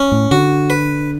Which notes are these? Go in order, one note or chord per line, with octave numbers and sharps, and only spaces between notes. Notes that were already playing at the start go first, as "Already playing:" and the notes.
Already playing: C#4
A2
D3 F#4
B4